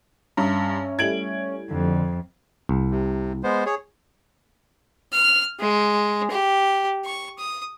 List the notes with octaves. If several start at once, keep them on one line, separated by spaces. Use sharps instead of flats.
G2 C#4 E5 A#5
G3 A3 E4 G#6 D7 F#7
F2 D3
C2
C3
G#3 B3 C5
G#4 C#5
F6
G#3
G4
C#6
D#6